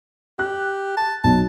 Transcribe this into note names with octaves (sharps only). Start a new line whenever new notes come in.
G4 F#6
A5
B1 A5